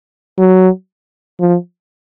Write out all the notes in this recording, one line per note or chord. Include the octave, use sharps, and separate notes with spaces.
F#3
F3